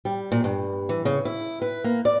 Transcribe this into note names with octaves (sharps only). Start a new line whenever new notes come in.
G3
A#2
G2
E3
C#3
E4
B4
A#3
D5